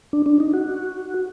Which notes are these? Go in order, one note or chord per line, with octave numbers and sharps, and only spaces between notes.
D4
D4
D#4
F#4